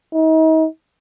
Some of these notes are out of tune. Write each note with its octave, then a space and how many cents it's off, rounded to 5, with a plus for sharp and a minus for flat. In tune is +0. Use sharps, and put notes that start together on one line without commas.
D#4 +40